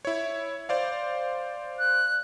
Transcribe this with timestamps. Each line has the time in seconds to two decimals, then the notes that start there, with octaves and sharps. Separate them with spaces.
0.05 E4 C#5
0.69 C5 D5 F5
1.79 F#6